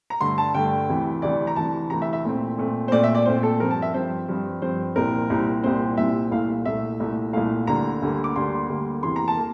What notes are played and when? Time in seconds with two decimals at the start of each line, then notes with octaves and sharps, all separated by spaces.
0.10 A#5
0.21 G2 D3 A3 C6
0.38 A5
0.54 G2 D3 A3 G5
0.89 D2 C3 E3
1.22 D2 C3 E3 D5
1.47 A#5
1.56 D2 C3 E3 A5
1.90 D2 C3 E3 A#5
2.02 E5
2.13 E5
2.25 A#2 A3 C4
2.58 A#2 A3 C4
2.88 C5
2.92 A#2 A3 C4 D5
3.04 E5
3.15 D5
3.26 A#2 A3 C4 C5
3.43 A4
3.60 G2 F3 C4 A#4
3.71 A5
3.82 E5
3.94 G2 F3 C4 C5
4.29 G2 F3 C4
4.62 G2 F3 C4 C5
4.95 C2 A#2 G3 C4 A#4
5.30 C2 A#2 G3 C4
5.64 C2 A#2 G3 C4 C5
5.97 C2 A#2 G3 C4 E5
6.31 C2 A#2 A3 F5
6.65 C2 A#2 A3 E5
7.00 C2 A#2 A3
7.33 C2 A#2 A3 F5
7.67 D2 D3 G3 A#3 A#5
8.02 D2 D3 G3 A#3
8.24 D6
8.36 D2 D3 G3 A#3 C6
8.69 D2 D3 G3 A#3
9.03 E2 C3 E3 A#3 C6
9.16 A#5
9.28 A5
9.37 A#3